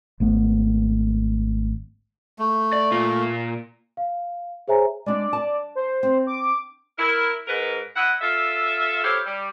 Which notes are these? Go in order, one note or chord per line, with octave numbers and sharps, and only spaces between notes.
G#1 A3 B3
A3
D5
A#2 F4
F5
G#4 C5 C#5 E5 G#5 A#5
G#3 D4 D5
A5
C5
C4
D6
E4 A#4
G#2 A#4 B4
E4 D#5 E5 F#5
F4 A4 E5
E4 G4 A4 C5 C#5 F5
G3